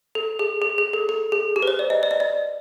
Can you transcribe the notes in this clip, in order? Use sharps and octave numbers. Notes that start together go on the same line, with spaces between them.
A4
G#4
G#4
G#4
A4
A4
G#4
G4
B4
C5
D5
D#5
D5
D#5
D5